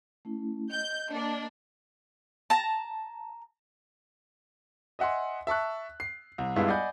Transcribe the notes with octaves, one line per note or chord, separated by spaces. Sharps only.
A3 C#4 E4
D#5 G6
A#3 D4
A5 A#5
D#5 E5 F#5 G#5 C6
E5 A5 C#6 F#6
C7
C2
G2 G#3 B3 E4 F4
D5 D#5 F#5 G#5 B5 G6